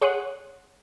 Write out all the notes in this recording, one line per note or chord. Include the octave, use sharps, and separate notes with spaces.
G#4 C#5 F#5 C6 D#6 F#6